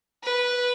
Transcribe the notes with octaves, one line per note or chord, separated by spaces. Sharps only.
B4